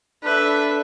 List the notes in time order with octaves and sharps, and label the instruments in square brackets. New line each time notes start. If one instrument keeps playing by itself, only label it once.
[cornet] D4 [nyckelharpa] A4 E5 [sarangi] B4